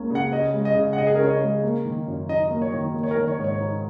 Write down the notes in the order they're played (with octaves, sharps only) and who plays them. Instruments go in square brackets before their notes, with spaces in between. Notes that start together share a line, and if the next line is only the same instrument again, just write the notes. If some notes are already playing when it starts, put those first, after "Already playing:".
Already playing: [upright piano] C#2 C#3 A#3 C#4
[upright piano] C#3 [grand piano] F#5
[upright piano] C#4 [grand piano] D#5
[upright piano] G#3
[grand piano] D#5
[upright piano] C#3
[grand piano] F#5
[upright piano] C#3 [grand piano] D#5
[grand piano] G#4
A#4
[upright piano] C#4 [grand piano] C#5
[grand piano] D#5
[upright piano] G#3
A#3
D#3
F#2
[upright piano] D#4 [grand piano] D#5
[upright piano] A#3
[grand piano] C#5
[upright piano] D#3
A#3
[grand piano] C#5
A#4
[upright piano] D#3
[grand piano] C#5
[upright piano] G#2
[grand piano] C#5
[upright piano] D#4